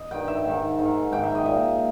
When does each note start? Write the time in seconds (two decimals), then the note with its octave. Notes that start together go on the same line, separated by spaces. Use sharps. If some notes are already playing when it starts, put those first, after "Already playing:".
Already playing: D#5
0.11 G2 D#3 G5
0.28 E5
0.44 G#2 D#3
0.78 G#2 D#3
1.12 G#2 D#3 G5
1.23 E5
1.35 D#5
1.46 A#2 E5